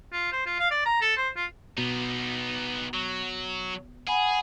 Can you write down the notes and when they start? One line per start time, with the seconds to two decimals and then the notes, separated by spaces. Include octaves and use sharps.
0.13 F4
0.32 C5
0.46 F4
0.59 F5
0.71 D5
0.86 A#5
1.01 A4
1.17 C5
1.36 F4
1.78 B2 B3 D#4
2.94 F#3
4.07 G#4 F#5 G#5 B5